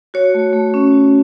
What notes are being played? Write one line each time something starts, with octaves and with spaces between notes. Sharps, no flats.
F#4 C#5
A3
A3
C#4
F#4